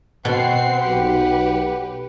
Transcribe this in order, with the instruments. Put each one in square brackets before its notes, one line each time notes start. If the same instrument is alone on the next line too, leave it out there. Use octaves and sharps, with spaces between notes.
[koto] B2 [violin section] C4 C7 [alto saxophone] F#5
[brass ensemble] B1 [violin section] G4 B4